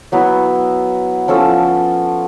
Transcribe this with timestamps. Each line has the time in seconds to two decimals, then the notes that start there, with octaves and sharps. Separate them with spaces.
0.12 F#3 B3 E4
1.28 F3 C#4 A4